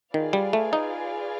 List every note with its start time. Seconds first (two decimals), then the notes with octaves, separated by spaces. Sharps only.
0.14 D#3 F4 G#4 B4 D5 F5
0.33 G3
0.53 A3
0.73 D#4